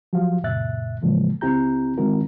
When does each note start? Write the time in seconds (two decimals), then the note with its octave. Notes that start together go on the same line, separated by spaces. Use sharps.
0.13 F3 F#3 F#4 G4 F5
0.44 C#2 F#2 A#2 E5 F#6 A6
1.02 A2 C#3 E3 F3 G#3 A#3
1.41 C#2 C4 E4 G4 A#5 G6
1.98 D#3 G#3 C4 E4 F#4 A#4